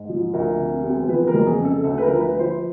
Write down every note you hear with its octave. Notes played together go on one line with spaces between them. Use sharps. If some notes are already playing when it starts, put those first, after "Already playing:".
Already playing: G#2
F3
D2 A#4
C3
E1
F3 B4
A#4
F2
G#4
C#3
A4
D2 A4
B4
A#4
F3
B4
F3
C5